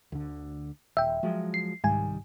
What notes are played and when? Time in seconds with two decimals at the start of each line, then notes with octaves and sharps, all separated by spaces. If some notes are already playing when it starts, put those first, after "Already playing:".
0.12 D2 D3
0.97 D#1 E5 G5
1.23 F3 F#3 G#3
1.54 C7
1.84 C2 G#2 D#3 G3 G#5